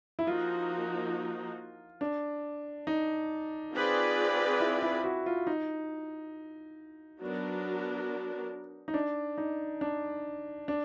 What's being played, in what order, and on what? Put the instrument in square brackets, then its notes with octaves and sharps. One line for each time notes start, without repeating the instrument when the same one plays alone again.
[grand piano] E4
[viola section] F3 A#3 D#4 F#4 [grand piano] F4
[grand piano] D4
D#4
[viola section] C4 F4 G#4 B4 D5
[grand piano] E4
E4
F#4
F4
D#4
[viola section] F#3 B3 D4 F#4 A#4
[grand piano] D#4
D4
D#4
D4
D4